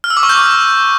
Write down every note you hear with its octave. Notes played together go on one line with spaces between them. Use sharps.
F6
E6
D6
C#6
G6